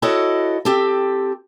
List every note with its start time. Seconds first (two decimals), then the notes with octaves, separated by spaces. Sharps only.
0.02 E4 F#4 A4 C#5 D#5 F#5
0.65 C4 G4 A4